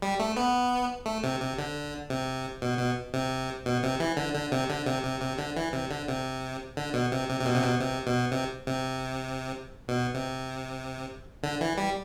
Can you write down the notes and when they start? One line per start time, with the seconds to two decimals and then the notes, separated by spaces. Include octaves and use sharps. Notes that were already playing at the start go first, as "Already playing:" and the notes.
0.02 G3
0.19 A3
0.37 B3
1.06 A3
1.24 C3
1.41 C3
1.58 D3
2.10 C3
2.62 B2
2.79 B2
3.14 C3
3.66 B2
3.83 C3
4.00 E3
4.17 D3
4.34 D3
4.52 C3
4.69 D3
4.86 C3
5.04 C3
5.21 C3
5.38 D3
5.56 E3
5.73 C3
5.90 D3
6.08 C3
6.77 D3
6.94 B2
7.12 C3
7.29 C3
7.41 C3
7.46 B2
7.55 C3
7.63 B2
7.80 C3
8.07 B2
8.32 C3
8.67 C3
9.88 B2
10.15 C3
11.43 D3
11.61 E3
11.78 G3